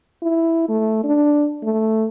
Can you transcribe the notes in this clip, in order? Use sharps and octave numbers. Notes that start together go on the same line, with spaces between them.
E4
A3
D4
A3